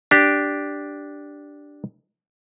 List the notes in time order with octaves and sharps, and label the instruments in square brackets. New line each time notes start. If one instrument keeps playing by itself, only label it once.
[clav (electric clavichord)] D4 G4